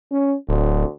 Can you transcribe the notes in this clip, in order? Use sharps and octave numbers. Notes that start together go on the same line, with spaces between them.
C#4
D1 D2